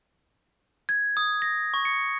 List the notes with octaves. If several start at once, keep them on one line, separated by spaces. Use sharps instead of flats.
G#6
D#6
A#6
C#6
C#7